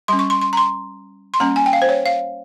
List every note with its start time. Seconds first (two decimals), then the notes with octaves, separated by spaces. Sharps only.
0.08 G3 C#4 C6
0.19 C#6
0.30 C6
0.41 C6
0.53 A#5
0.57 C6
1.34 C6
1.40 G3 A#3 C#4 A#5
1.56 G#5
1.66 G5
1.73 F5
1.82 C5
1.89 C#5
2.06 F5